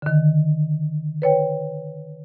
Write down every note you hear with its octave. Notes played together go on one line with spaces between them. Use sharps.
D3 D#3
B4 C#5 G5